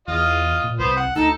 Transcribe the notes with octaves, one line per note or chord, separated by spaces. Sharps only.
E2 F4 D#5
A#2
C2 B3 C5
F#5
D2 D#4 A4